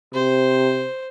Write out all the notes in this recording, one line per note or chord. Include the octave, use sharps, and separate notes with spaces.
C3 C5